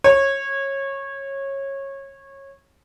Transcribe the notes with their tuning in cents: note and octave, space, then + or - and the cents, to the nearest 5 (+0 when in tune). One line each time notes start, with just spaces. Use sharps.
C#5 -20